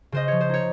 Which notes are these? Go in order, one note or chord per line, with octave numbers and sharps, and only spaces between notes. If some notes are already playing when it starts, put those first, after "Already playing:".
C#3 C5 D#5
F3 C#5
C5
D#4 C#5